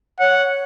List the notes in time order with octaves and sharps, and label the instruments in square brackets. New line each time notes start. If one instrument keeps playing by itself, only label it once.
[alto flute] C#5 [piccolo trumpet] F#5